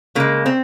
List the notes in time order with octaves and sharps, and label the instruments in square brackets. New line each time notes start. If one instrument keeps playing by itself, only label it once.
[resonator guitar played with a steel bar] C#3 G#3 A#3
C4